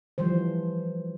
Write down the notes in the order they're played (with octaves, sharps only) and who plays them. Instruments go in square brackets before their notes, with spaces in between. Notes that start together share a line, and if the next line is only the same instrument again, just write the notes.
[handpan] E3 F3 G3 C5